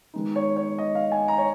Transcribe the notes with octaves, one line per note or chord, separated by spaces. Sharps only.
D#3 G#3 B3 D#4
C#5
C#5
D#5
F5
G#5
A#5
C#5